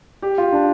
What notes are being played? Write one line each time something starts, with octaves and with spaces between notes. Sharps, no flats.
G4
F4
D4